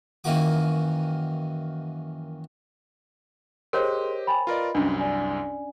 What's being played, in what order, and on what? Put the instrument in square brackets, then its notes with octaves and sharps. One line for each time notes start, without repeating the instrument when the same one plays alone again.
[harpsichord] F#2 D#3 E3 A#3 F#4 D6
[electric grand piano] G4 D#5 [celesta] G#4 C6 [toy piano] A#4 C5 C#5
[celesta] G5 G#5 A6 [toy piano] B5
[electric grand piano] F4 A#4 D5 [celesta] B4 D#5
[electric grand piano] C2 F#2 [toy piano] C#4 D4
[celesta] D5 G#5